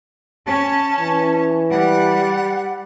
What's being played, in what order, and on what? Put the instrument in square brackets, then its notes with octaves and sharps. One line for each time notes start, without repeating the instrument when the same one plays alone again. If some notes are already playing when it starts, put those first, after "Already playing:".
[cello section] C#4 [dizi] A5
[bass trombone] E3
[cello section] G3 [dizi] F#5